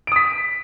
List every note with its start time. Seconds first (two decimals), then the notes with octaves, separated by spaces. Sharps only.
0.07 D7
0.12 D#6
0.16 B6